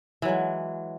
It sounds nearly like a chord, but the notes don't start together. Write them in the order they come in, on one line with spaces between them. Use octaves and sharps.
E3 F#3 G#3